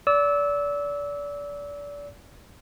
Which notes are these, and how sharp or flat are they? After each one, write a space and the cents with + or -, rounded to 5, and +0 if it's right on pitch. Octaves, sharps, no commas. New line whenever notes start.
D5 -30 E6 -20